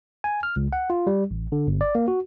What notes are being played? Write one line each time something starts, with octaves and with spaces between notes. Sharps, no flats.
G#5
F6
C#2
F#5
F4
G3
A1
D3
G1
D5
A#3
F#4